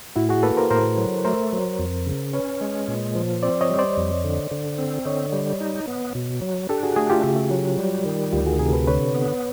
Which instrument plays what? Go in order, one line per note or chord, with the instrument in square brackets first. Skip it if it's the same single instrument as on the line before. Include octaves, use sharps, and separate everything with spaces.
[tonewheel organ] A2 [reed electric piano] E4 F#4
[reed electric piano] F#4 G#4
[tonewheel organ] A#3 [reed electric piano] A4 B4
[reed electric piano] A#4 C5
[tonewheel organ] A2 [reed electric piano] A#4 C5
[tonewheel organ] F#3
[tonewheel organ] A3 [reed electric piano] A#4 C5
[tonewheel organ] F#3
F2
C#3
[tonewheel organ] C#4 [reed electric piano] B4 C#5
[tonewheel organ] G#3
A#2
F3
[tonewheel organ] C4 [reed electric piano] C5 D5
[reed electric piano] C#5 D#5
[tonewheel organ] G3
[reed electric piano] C5 D5
[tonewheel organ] F2
D3
D3
C4
[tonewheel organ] D3 [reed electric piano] C#5 D#5
[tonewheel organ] G3
D#4
B3
B2
F#3
[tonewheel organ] D4 [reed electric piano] G4 A4
[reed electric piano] F#4 G#4
[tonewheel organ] A3 [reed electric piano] F#4 G#4
[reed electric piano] F4 G4
[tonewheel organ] C#3
F#3
G3
D#3
[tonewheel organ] D2 [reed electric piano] F4 G4
[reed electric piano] F#4 G#4
[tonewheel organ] C3 [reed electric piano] G#4 A#4
[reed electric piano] A4 B4
[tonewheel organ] D3 [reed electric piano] B4 C#5
[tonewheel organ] B3